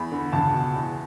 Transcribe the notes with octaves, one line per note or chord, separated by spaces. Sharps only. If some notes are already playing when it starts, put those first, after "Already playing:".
Already playing: E2 B5
D3
C#2 A5
B2
E2